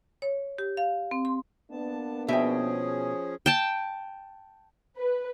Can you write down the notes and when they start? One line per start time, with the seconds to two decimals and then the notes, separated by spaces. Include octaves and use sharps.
0.22 C#5
0.58 G4
0.77 F5
1.11 C4
1.25 C6
1.71 A#3 B3 D4 A5
2.28 B2 F3 C#4 G#4 E5 G5
3.46 G5 A5
4.98 B4